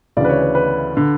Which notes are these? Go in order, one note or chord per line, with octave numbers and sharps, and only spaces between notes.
D2 C#3 E3 D5
B4
C#5
B4
B4
D3